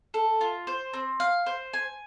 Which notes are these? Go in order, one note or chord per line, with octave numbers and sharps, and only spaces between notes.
A4
F4
C5
C4
F5
C5
G#5